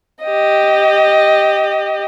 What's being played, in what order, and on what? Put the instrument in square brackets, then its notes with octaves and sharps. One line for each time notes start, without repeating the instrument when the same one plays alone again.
[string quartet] G4 D#5